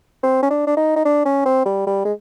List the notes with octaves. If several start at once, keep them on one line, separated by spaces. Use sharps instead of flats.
C4
C#4
D4
D4
D#4
D#4
D4
C#4
C4
G3
G3
G#3